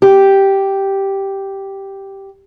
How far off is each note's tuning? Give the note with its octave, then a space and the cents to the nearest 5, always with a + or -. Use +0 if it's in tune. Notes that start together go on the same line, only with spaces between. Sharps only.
G4 -5